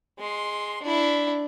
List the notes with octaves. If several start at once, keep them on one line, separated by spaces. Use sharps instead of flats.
G#3 C6
D4 E4